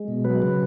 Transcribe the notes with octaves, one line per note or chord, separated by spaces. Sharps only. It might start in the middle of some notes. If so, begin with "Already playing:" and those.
Already playing: G#3
B2
F#3 B4
C#3